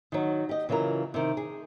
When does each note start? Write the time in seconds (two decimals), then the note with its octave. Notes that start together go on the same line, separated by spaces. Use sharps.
0.12 D#3 F#3
0.49 G4 D#5
0.69 C#3 E3 F#3 F4 A#4
1.14 C3 D#3
1.37 G#4